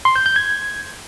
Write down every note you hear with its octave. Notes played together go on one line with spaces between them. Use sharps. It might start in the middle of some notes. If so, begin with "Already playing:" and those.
C6
G6
G6
G#6